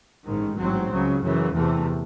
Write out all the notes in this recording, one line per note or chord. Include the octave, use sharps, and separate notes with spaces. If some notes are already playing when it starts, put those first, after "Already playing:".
A1 G#2 D#3
A1 G#2 F#3 C4
C#2 C#3 F#3
F#2 C#3 E3
E2 C3 E3 A3